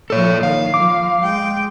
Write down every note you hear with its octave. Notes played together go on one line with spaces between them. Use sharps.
A#2 F3 A4 C#5
D#3 F5
F3 D6
G#3 G5